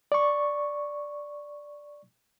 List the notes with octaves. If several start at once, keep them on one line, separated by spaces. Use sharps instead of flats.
D5 C#6